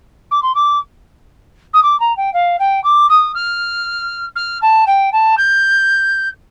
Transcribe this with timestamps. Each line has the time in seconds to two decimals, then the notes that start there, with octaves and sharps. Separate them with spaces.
0.31 D6
0.42 C6
0.55 D6
1.73 D#6
1.83 D6
2.00 A#5
2.17 G5
2.33 F5
2.59 G5
2.84 D6
3.09 D#6
3.34 F6
4.35 F6
4.62 A5
4.87 G5
5.12 A5
5.37 G6